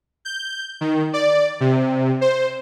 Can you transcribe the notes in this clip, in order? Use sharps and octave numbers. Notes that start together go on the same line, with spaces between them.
G6
D#3
D5
C3
C5